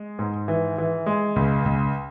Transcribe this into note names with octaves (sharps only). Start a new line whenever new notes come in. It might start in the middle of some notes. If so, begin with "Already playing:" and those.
Already playing: G#3
G#2
E3
E3
G#3
C#2
C#2